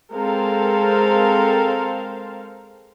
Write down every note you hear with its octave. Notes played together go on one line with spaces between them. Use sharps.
G#3 C4 A4 A#4 C5 F5